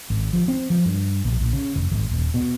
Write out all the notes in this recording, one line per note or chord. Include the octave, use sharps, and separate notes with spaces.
G#1
F3
C4
F3
G2
A#1
A#1
C#3
F1
G#1
D#1
B2